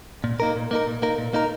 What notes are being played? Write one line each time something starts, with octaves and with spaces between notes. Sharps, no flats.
A#2
A#3 D#4 A#4
A#2
A#3 D#4 A#4
A#2
A#3 D#4 A#4
A#2
A#3 D#4 A#4